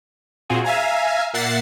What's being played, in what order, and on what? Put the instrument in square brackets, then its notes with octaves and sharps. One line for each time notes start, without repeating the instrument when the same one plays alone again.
[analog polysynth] A#2 C4 F4 F#4 G#4
E5 F5 G#5 A#5
A#2 A#3 E5 F#5 A6 C7